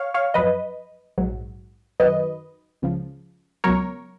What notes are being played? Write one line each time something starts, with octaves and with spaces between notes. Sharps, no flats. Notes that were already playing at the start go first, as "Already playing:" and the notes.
Already playing: C#5 F5
C#5 F5
F#2 F3 B4 D#5
A#1 G#2 F#3
F#2 D#3 F#3 B4 D#5
C#2 C#3 F3
C#2 B2 F#3 A#4 C#5